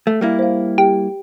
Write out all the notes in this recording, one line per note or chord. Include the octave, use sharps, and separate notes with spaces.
A3
G3 A#3 E4
C5 F5
G4 G5